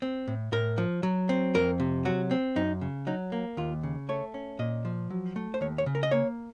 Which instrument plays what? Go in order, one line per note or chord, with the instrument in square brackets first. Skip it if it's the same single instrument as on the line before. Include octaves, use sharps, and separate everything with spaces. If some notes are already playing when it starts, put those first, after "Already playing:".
[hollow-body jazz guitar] C4
A2
A2 A#4
F3
F#3
C4
F2 A#4
C3
F#3 F#4
C4
F#2 D#4
C#3
F#3 D#4
A#3
D#2 F4
C#3
A3 C#5
C#4
A#2 D#5
F3
F#3
A3
C5
D#2 C#5
C#5
C#3
A#4
D#5
A#3 C#5